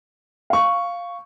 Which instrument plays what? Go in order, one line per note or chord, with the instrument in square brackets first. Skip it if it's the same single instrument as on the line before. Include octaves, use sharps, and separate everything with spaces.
[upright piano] F5 C#6